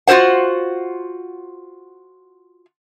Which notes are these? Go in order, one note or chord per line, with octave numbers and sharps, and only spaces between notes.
F4 F#4 A#4 C5 F#5